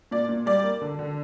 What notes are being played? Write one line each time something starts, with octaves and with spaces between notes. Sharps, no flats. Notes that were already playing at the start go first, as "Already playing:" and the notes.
A#2 D5
A#2
G3 D5
A#3
D3
D3